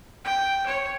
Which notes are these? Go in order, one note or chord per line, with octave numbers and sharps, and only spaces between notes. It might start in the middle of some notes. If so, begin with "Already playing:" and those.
G5
C#5